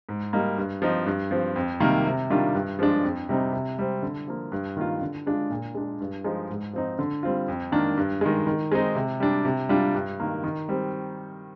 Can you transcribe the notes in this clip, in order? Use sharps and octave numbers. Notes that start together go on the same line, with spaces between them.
G#2
G3 A#3 D#4
G2
F3 C4 D#4
G2
F3 C4
F2
C3 D#3 G3 A#3
C3
D#3 G3 D4 F4
G2
F3 G#3 D4
F2
C3 G3 C4 D#4
C3
G3 C4
D3
F3 A#3
G2
D#3 A#3 F4
D3
G#3 D4 F4
A#2
G#3 D4
G2
F3 G#3 D#4
G#2
F3 C4 D#4
D3
G3 C4 F4
F2
D#3 A#3 D4
G2
D#3 G#3
D#3
G#3 C4 D#4
C3
G3 D4
C3
G3 D4 F4
G2
D#3 A#3
D#3
G3 C4